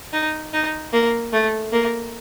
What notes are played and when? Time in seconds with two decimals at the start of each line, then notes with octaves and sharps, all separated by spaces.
0.13 D#4
0.53 D#4
0.93 A#3
1.32 A3
1.72 A#3